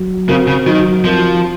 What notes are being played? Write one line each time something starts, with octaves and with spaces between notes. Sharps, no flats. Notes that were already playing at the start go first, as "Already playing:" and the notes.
Already playing: F#3
C#3 C4 F#4 A#4
C#3
D#3 F#3
F3 C4 F#4 A#4